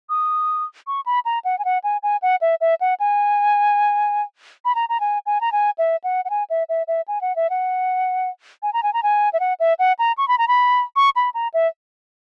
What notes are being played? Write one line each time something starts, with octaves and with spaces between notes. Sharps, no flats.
D#6
C#6
B5
A#5
F#5
G#5
F#5
G#5
G#5
F#5
E5
E5
F#5
G#5
B5
A#5
A#5
G#5
G#5
A#5
G#5
E5
F#5
F#5
G#5
E5
E5
E5
G#5
F#5
E5
F#5
G#5
A#5
G#5
A#5
G#5
E5
F#5
E5
F#5
A#5
C#6
B5
A#5
B5
C#6
B5
A#5
E5